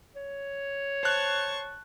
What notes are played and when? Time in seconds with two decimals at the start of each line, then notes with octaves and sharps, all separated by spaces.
0.16 C#5
1.03 C5 A5 C#6 F#6